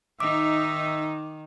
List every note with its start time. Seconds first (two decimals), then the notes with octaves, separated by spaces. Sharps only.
0.20 D#3 D#4 E5 D6